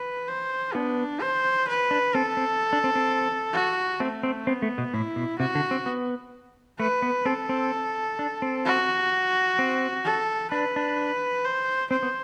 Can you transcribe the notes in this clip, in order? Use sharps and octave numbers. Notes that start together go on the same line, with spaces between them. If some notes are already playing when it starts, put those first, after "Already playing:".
Already playing: B4
C5
B3 D4
C5
B4
D4
C4 A4
C4
D4
C4
C4
F#4
A3 C4
C4
B3 C4
A3
B2
A2 E4
B2
C3 F#4
D3
C4
B3
A3 B4
B3
C4 A4
C4
D4
C4
F#4
C4
A4
D4 B4
D4
C5
C4 C5
B3